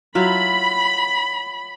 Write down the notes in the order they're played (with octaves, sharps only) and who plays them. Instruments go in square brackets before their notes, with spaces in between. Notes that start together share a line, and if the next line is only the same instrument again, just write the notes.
[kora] F#3 E4 F4 [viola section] B5